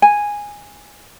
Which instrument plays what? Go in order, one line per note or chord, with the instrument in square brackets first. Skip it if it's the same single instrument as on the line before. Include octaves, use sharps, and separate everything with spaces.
[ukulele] G#5